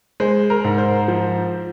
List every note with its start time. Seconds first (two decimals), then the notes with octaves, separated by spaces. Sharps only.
0.20 G#3 C5
0.50 A#4
0.64 G#2
0.78 C5
1.08 F3